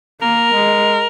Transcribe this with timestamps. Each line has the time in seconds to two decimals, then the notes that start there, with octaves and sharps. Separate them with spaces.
0.22 A#3 A#4
0.55 G#3